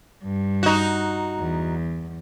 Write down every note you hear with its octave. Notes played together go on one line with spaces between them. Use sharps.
G2
D#4 F#4
E2